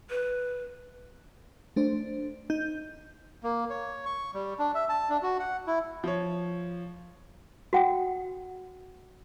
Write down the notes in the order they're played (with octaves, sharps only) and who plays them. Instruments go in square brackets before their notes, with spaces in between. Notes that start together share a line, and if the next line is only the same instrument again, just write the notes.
[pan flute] B4
[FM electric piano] A3 D4 C5
D#4 G6
[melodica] A#3
C#5
C#6
G3
D4
E5
A5
D4
F#4
F#5
E4
[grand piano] F3 C#5
[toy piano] F#4 F#5 G5